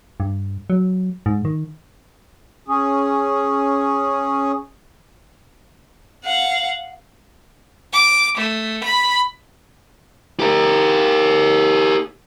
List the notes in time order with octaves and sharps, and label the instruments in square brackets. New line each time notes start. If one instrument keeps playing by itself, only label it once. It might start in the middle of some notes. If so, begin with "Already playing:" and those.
[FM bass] G2
F#3
G#2
D#3
[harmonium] C#4 G#4
[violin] F5 F#5
D6
A3
B5
[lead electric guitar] G4 A#4